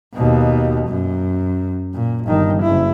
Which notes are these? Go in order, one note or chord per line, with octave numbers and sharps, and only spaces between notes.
D#2 B2
F#2
A#2
G1 D#3
F#1 E4